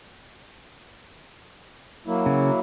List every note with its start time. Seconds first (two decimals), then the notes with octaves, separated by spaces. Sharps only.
2.07 F#3 A#3 E4
2.26 C#3